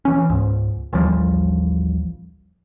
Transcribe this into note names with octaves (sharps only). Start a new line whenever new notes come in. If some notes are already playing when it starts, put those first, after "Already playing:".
E3 C#4
C#2 G#2
A1 D#2 F3 G3